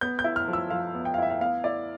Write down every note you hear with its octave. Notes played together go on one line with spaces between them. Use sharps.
B3 G6
G6
E4
F6
F3
E6
F3 F5
B3
G5
F5
E4 E5
F5
B3 F5
E4 D5